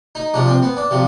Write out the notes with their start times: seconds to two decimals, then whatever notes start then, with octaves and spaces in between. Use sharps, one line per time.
0.15 D#4
0.34 C3 F3 D4
0.48 C4
0.63 B3
0.77 D4
0.91 C3 F3